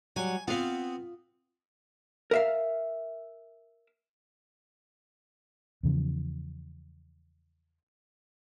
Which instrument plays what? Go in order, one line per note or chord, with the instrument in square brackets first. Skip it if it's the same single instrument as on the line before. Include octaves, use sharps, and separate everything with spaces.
[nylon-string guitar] F#3 G3 [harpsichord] G#5
[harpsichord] B3 C4 [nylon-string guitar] F4 F5
[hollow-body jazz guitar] A#4 E5 F5
[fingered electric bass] E2 C#3 F3